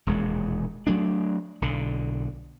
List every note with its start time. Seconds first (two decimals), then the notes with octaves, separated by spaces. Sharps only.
0.07 E1 D#2 A#2 G#3
0.87 F#3 A3 D4
1.62 B1 D3